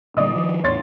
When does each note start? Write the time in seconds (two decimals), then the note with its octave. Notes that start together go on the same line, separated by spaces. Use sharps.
0.17 A#2 D3 G3 D5 D#5 D#6
0.36 D#3 F3
0.64 E2 A2 C#5 C6 A6